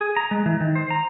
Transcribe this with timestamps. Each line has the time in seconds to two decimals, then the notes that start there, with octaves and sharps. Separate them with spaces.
0.01 G#4
0.16 A#5
0.31 G#3
0.46 E3
0.60 D#3
0.76 C5
0.90 A#5